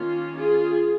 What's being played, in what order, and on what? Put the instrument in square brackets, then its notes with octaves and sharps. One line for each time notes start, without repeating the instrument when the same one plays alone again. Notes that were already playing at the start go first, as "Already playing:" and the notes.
Already playing: [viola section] D#3 A#3 C#4 F4
F4 G#4